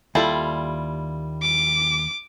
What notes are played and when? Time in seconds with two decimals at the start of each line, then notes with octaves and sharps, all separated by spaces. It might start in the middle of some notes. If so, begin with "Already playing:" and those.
0.15 D#2 G3 E4 F4 A4 A5
1.42 D6